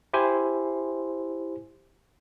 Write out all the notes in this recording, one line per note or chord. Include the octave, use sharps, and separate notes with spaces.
E4 G4 C5 G#5 C6